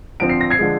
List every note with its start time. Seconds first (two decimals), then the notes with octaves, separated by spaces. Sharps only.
0.20 D3 F3 C4 D7
0.29 C7
0.41 A#6
0.50 G#6 C7
0.59 D3 F3 G#3